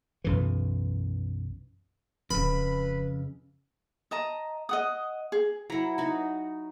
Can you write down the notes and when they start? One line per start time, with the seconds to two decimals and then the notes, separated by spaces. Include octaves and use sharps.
0.24 B1 F#2 E3
2.31 D1 F2 C#3 B4 B5
4.11 D#5 A5 A#5
4.69 D#5 F#5 D#6
5.32 G#4
5.70 F#3 E4 A#5
5.98 D#4 F#4